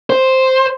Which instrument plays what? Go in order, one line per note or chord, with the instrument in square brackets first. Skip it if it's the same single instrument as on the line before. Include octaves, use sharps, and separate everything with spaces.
[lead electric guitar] C5